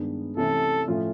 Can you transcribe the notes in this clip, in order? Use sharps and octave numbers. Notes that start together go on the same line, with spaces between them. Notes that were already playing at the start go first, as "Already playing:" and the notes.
Already playing: G2 D#3 G#3 B3 D4
C3 E3 A3 C#4 A4
A2 F3 A3 C#4 F4